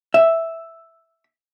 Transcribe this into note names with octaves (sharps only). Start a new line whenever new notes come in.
E5